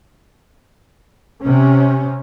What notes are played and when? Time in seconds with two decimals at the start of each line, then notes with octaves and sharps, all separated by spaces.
1.43 C3 C#4